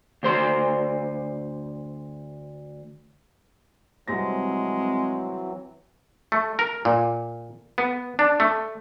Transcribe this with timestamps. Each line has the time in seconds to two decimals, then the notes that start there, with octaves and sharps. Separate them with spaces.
0.23 D2 C5 C6
4.08 C2 E3 F#3 G#3 C4 G4 A#6
6.32 A3
6.59 A#4
6.85 A#2
7.78 B3
8.19 D4
8.40 A3